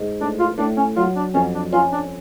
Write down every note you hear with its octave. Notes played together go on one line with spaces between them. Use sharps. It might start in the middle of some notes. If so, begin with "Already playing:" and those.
Already playing: G#2
A2 D4
F4
A2 D4
C#4
F#3 F4
D4
F2 C#4
D4
C#4 F4
D4